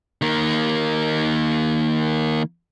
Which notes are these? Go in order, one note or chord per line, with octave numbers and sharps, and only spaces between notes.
D#3 A#3